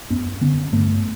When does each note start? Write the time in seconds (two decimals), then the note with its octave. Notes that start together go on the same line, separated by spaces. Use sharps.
0.10 F#2 B3 C#4
0.41 D3 B3 C#4
0.73 G2 A3 B3